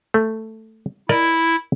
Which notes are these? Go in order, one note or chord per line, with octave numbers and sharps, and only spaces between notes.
A3
E4 A#4 D5 D#5